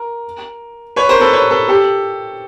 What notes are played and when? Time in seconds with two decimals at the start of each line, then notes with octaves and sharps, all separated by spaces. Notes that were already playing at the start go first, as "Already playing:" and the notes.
Already playing: A#4
0.96 B4 C#5
1.09 A#4 C5
1.20 A4 B4
1.33 B4 C#5
1.50 A4 B4
1.68 G4 A4